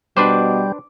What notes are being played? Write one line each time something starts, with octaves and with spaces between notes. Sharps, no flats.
B2 G3 D4 B4 C5 D6